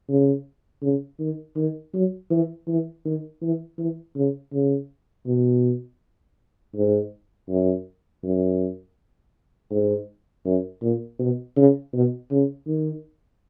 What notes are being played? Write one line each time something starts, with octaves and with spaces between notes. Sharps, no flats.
C#3
C#3
D#3
D#3
F#3
E3
E3
D#3
E3
E3
C#3
C#3
B2
G#2
F#2
F#2
G#2
F#2
A#2
B2
C#3
B2
C#3
D#3